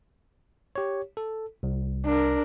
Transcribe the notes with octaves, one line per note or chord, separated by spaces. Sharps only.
G4 C#5
A4
C2
D4 A#4